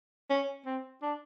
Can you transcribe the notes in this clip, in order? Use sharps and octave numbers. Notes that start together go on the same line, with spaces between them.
C#4
C4
D4